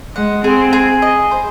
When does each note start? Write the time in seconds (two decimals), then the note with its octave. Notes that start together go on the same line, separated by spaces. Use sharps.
0.15 G#3 F#5
0.44 C4 G#4
0.73 G#4
1.02 D#5
1.31 C5